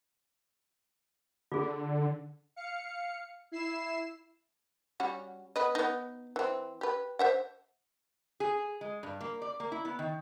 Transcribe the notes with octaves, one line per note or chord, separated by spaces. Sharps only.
D3 F4 G#4
F5 C#7
E4 C7 E7
G3 C#4 F#4
B3 B4 D#5
B3 D#4
E3 C4
G4 B4
C5 E5 F#5
G#4
G#3
G2
A#3
D5
A#3
E4
B3
D#3